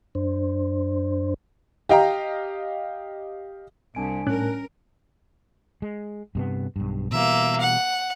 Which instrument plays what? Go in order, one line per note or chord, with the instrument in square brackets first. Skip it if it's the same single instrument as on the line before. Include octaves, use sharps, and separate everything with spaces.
[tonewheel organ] F#2 D4 C5
[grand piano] G4 D#5 F5 G5 A#5
[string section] C2 [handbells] D4 G#5 D7
[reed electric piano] A2 F#6 [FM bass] C#4 [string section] A#4
[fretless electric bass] G#3
G2 C3 B3
B1 G2
[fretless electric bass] B2 E3 G3 [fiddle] A#3 E5
[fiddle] F#5